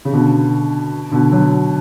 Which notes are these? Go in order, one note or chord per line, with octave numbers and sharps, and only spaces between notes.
C#3
B2 D3
B2 D3
D3 F#3